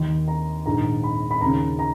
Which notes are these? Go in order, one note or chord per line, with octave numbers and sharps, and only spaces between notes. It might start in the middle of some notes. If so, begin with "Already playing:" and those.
Already playing: D#2 D#3
A#5
A#1 G#2 D#3 A#5
B5
B5
D#2 C#3 A#5
A#5